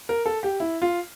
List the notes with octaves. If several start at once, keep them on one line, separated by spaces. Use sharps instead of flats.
A#4
A4
G4
E4
F4